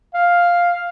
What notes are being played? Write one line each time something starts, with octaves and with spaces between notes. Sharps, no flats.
F5